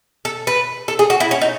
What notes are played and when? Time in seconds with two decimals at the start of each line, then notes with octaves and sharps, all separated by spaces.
0.25 A4
0.47 B4
0.88 A4
0.99 G#4
1.10 F#4
1.20 E4
1.31 C#4
1.41 D#4